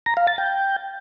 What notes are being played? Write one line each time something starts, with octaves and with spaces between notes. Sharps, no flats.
A#5
F5
A6
G5